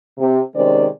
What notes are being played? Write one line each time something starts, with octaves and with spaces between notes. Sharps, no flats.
C3
C3 D#3 G#3 C#4 C5 D5